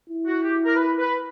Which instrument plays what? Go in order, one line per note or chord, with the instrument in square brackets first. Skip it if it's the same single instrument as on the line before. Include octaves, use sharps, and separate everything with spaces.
[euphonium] E4
[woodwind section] F#4
G4
A#4
B4
B4